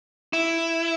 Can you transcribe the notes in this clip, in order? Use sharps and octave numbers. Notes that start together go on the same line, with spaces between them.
E4